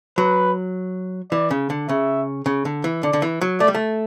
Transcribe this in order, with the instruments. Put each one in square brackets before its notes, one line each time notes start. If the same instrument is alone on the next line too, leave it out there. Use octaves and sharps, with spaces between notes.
[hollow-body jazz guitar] F#3 [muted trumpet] B4
[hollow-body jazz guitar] E3 [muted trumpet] D5
[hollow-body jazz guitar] C#3
D3
[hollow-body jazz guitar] C#3 [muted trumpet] E5
[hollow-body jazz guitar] C#3
D3
E3
[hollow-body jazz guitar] D3 [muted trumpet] D5
[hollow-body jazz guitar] D3
E3
F#3
[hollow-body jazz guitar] A3 [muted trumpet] D5
[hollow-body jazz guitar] G3
A3